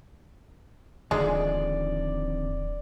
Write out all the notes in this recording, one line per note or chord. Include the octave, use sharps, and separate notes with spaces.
D1 F2 D3 D#3 G#3 D5